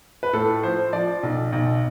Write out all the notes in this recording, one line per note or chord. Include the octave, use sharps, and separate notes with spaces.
B4
A2 A4
F3 C5
F3 D5
B1
B1